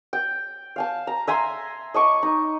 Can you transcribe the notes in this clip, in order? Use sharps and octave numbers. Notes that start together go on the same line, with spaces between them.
G5
F5 G#5 A5
A#5
E5 G#5 A#5 C6
D#5 A5 C#6 D6
D#4